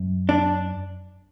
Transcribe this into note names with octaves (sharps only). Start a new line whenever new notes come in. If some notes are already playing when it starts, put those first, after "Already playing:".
Already playing: F#2
D4